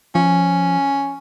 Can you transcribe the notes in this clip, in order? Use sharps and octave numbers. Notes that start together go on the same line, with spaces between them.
F3 C#4